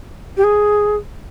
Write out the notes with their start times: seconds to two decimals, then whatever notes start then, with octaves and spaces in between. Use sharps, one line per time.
0.37 G4
0.43 G#4